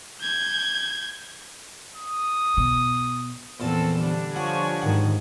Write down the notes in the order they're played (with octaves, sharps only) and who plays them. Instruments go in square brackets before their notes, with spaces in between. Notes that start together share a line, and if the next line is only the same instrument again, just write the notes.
[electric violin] G6 G#6
[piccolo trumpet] D#6
[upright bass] B2
[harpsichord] A#1 E2 A5 [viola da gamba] C4 A4
[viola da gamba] D3 G3 D4
[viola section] F3 C#5 G#5 [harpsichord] F#5
[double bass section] G#2 D#3 [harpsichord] F#5